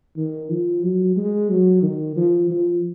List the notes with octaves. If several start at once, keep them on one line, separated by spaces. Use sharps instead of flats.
D#3
F3
F#3
G#3
F#3
D#3
F3
F3